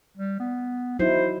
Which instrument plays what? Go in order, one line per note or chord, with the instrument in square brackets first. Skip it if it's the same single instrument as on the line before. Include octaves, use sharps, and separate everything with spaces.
[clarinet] G3
B3
[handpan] F#3 D#4 E4 [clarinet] C5